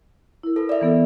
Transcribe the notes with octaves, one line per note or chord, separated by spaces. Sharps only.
E4 A#4
A4 B4
D5 E5
E3 B3 A4